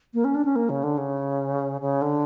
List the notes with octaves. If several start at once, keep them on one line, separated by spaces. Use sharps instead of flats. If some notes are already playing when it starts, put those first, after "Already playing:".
A#3
C#4
D4
C#4
A#3
C#3
D3
C#3
C#3
D3